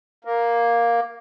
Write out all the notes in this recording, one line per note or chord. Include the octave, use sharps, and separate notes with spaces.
A#3